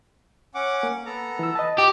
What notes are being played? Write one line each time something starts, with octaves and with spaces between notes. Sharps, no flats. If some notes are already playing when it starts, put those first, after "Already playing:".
C#4 F#5 D6
A#3
B3 A4 A#5
E3 E6
B4 D#5 A5
G4 A#5 D6